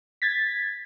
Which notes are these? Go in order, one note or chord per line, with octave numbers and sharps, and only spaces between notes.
G#6 A6 B6